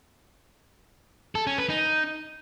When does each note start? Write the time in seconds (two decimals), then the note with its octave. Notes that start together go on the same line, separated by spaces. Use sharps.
1.35 A4
1.47 C#4
1.58 B4
1.70 D#4